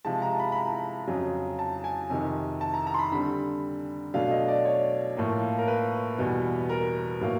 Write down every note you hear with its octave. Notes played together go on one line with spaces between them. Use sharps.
C3 F3 G#3 A5
A#5
B5
B5
A#5
F2 C#3 F#3
A5
G#5
F2 C3 D#3
A5
A#5
A#5
C6
B5
D3 G3 C4 B5
B2 F#3 A3 D4 F5
D#5
D5
C#5
A2 F3 A#3
A#4
B4
E2 B2 G3 B3
A#4
A2 F#3 A#3